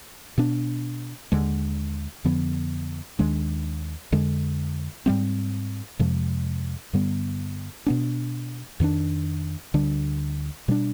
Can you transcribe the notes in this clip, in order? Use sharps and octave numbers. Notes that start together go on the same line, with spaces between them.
B2 B3 D4
D#2 D3 G#3
F2 D3 F3 B3
D#2 D#3 G#3 D4
F2 D3 G#3
G#2 G3 C4
F2 C3 F3 G#3
G2 D3 G3 B3
B2 B3 D4
F2 D#3 B3 D4
D2 D3 G3 D4
B2 G3 B3 D4